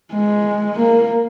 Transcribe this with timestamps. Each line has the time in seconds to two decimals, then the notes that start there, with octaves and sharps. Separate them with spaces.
0.13 G#3
0.78 A#3